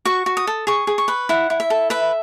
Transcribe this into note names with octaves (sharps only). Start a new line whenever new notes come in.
F#4 C#6
F#4
D#6
A4
G#4 C#6
G#4
C#6
B4
E4 F#5
E4
E5
A4
B4 E5